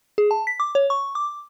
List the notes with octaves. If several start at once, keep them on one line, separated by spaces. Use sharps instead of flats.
G#4
A5
B6
D6
C#5
C#6
D6